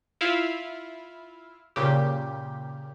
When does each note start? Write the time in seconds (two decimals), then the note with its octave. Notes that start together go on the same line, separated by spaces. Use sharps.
0.21 E4 F4 F5
1.76 A#2 C#3 G4